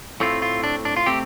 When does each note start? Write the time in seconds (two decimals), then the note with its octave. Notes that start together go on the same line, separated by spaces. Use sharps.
0.20 A2 A3 C4 F4
0.42 F4
0.63 D4
0.85 D4
0.96 F4
1.06 C3 A3 C4 G4